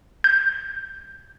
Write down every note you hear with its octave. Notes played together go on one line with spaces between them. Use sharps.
G6